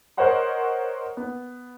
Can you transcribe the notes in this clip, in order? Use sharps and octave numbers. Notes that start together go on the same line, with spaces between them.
A#4 C5 C#5 D#5 F#5 C6
B3